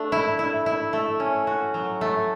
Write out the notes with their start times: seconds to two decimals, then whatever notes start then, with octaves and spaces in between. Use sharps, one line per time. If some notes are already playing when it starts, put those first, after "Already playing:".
Already playing: A3 D4
0.12 E4
0.39 E4
0.66 E4
0.93 A3
1.20 C#4
1.47 F#4
1.74 F#3
2.01 A3